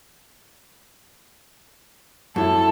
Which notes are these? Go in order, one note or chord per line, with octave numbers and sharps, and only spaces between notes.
F#2 E4 A4